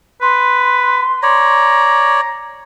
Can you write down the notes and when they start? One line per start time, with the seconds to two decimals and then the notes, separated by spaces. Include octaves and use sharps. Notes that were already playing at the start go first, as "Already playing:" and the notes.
0.22 B4 C6
1.23 C#5 D5 A#5